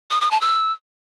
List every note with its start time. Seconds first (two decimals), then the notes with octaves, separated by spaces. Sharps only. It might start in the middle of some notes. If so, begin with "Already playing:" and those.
0.11 D#6
0.21 D#6
0.31 A5
0.41 E6